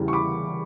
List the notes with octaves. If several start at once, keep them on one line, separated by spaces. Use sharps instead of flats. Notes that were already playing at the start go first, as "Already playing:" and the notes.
Already playing: E2 C#3 E3 G3
C#6
B5 D6